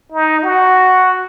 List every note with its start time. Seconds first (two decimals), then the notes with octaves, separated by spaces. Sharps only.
0.13 D#4
0.43 F#4